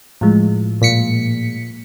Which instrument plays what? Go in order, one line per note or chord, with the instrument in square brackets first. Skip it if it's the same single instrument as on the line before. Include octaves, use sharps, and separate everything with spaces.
[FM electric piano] A2 F3 G#3
[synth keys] A#2 B6 C#7